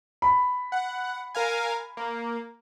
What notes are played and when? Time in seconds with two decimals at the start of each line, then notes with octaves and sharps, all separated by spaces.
0.22 B5
0.72 F#5
1.35 A#4 F5 G#5
1.97 A#3